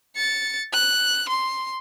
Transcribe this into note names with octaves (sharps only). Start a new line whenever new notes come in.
A6 C#7
F#6
C6